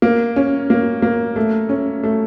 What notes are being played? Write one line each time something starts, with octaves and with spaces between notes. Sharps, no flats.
A#3
C#4
A#3
A#3
A3
C#4
A3